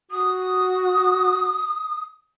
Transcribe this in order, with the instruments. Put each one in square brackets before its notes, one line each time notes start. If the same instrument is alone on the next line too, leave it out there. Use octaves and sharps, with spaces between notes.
[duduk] F#4 [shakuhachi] D#6